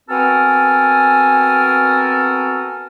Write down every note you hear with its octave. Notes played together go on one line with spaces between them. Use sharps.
B3 C4 F#4 A4 A#4 G#5